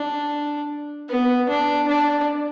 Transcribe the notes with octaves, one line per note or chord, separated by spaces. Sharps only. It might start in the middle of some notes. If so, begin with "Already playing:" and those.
Already playing: D4
B3
D4
D4